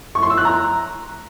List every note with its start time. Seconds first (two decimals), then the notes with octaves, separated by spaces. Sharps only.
0.15 C#6
0.23 C6
0.30 E6
0.37 F#6
0.45 A#5